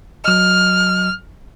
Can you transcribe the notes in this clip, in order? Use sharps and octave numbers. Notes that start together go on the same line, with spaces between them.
F#3 D#5 F6